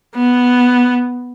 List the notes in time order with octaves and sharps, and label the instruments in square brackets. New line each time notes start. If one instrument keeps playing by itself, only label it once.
[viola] B3